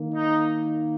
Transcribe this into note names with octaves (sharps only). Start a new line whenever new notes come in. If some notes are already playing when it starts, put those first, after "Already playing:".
Already playing: D#3 A#3
D#4